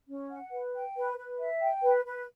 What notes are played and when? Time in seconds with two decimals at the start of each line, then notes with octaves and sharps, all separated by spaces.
0.09 C#4
0.30 F#5
0.52 B4
0.74 G5
0.96 B4
1.18 B4
1.39 E5
1.61 G5
1.83 B4
2.05 B4